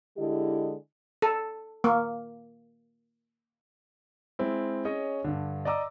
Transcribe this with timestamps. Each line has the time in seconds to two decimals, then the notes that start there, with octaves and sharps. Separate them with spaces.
0.17 D3 G#3 E4 G4 D#5
1.22 A4
1.84 A#3
4.39 G#3 C4 E4
4.85 C#4 G#4 C#5 D#5
5.24 G2 D3
5.65 D5 D#5 A#5 D6 E6